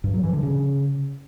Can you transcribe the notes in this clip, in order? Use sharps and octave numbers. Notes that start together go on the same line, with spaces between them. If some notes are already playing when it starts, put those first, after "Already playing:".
G2
F#3
E3
D3
C#3